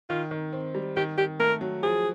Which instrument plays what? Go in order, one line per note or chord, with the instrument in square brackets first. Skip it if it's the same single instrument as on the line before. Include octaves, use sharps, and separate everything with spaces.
[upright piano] D#3 [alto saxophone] F4
[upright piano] D#3
C4
G3
[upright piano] D#3 [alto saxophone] G4
[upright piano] D#3 [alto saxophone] G4
[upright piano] A3 [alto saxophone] A#4
[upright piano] F#3
[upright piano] F3 [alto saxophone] G#4